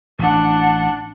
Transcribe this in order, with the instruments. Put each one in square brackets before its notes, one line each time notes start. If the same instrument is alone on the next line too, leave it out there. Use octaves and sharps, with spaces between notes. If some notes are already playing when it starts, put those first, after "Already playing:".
[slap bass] A1 [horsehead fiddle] D4 F#5